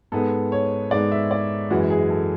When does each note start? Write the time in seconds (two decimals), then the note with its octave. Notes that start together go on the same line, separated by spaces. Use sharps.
0.12 G#2 G#3 B3 A4
0.52 C#5
0.91 G#2 G#3 B3 D5
1.12 E5
1.31 D5
1.70 F#2 E3 G#3 F#4
1.90 G#4
2.10 A4